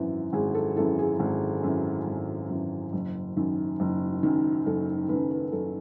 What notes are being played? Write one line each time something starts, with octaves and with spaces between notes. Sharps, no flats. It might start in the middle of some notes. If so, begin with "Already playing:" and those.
Already playing: G#1 F#2 E3
G#1 G#4
A4
F#2 E3 A4
G#4
G#1
F#2 E3
G#1
F#2 E3
F#1
F#2 D#3
F#1
F#2 D#3
F#1 A4
F#2 D#3 B4
B4
F#1 A4